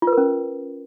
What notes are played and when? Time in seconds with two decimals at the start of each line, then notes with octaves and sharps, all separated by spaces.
0.02 F4
0.07 B4
0.12 A#4
0.18 C#4